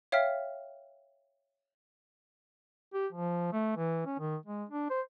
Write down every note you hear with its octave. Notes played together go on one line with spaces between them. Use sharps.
C#5 E5 F5 G5 F6 B6
G4
F3
A3
E3
C#4
D#3
G#3
D4
C5